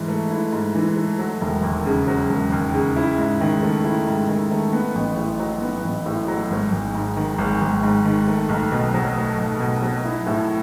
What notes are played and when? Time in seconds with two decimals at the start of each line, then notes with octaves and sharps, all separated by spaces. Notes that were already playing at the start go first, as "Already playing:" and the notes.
Already playing: G#2 E3
0.08 A3
0.30 E4
0.52 G#2
0.75 E3
0.97 A3
1.19 F#3
1.41 E1
1.63 D#2
1.86 C#3
2.07 F#3
2.30 E1
2.52 D#2
2.74 C#3
2.96 E4
3.18 G#2
3.41 D#3
3.63 A3
3.85 E4
4.07 G#2
4.29 D#3
4.51 A3
4.73 B3
4.95 A1
5.17 A2
5.40 F#3
5.62 B3
5.84 A1
6.06 A2
6.28 F#3
6.51 G#1
6.72 G#1
6.95 G#2
7.17 D#3
7.38 G#1
7.61 G#1
7.83 G#2
8.05 D#3
8.28 A3
8.49 B1
8.72 B2
8.94 F#3
9.16 A3
9.38 B1
9.60 B2
9.82 F#3
10.05 E4
10.27 A2